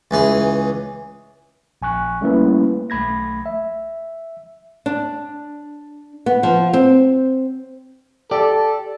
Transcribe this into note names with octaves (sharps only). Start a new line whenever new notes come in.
C#2 E3 G#4
A#1 G#5 C#6 F#6
G3 A3 A#3 C#4 E4 B4
B1 A3 B5 G#6 A#6
E5
D4
B3
F3
C4
G4 A4 D5